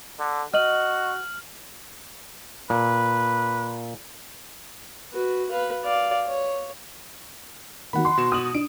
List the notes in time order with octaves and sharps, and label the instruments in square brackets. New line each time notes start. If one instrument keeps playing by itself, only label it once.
[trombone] D3
[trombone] F#4 [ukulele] D#5 [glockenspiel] F6 F#7
[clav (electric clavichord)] A#2 [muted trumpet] B4
[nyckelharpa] F#4 B4
B4 F5
D5 F5
C#5
[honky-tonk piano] D#3 F#3 [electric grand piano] F#5 B5
[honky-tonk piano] C6
[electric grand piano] B2 F#4 E7
[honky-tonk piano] D#6 F#7
[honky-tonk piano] D4 [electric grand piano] D7